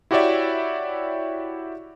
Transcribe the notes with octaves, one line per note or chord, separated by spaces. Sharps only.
E4 F#4 G4 C#5 D5 E5